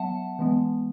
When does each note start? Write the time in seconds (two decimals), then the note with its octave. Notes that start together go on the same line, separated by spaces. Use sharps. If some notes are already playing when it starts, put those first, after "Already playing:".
Already playing: F#3 B3 E5 F#5 A5
0.39 E3 G#3 B3